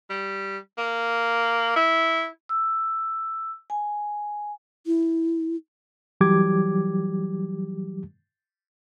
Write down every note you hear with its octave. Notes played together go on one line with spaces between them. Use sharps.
G3
A#3
E4
E6
G#5
E4
E3 F#3 G3 G4 D6 G#6